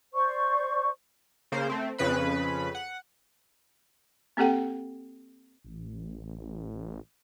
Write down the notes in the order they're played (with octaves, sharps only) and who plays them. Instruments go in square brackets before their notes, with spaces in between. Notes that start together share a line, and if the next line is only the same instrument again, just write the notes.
[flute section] C5 D5 C#6
[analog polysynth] C#3 A#3 C5
A3 C4
F2 C#3 B4 B5
F#5
[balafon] A#3 C4 G4 A4 F#5 G5
[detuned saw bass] A1